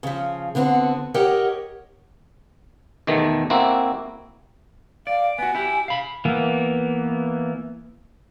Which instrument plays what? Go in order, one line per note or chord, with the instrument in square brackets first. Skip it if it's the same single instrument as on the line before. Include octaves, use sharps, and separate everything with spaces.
[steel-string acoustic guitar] C#3 F3
D3 B3 C4 F#4
G4 A#4 C#5 D#5 F#5
[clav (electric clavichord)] E2 B2 D#3 A3
A#3 C4 E4 F#4
[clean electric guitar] D5 [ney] F5
[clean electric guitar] B3 F#4 [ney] G#5
[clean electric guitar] E4 G4
F5 B5
[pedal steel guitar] E3 A#3 B3